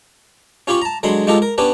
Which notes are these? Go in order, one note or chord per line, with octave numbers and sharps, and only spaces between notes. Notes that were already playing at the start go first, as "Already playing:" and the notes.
C#4 F4 G4 B5 C#6
A5 A#5
D3 F#3 G#3 B5 C6
G#3 D#4 F4 G4 A4
A#4
B3 C#4 D4 G4 B4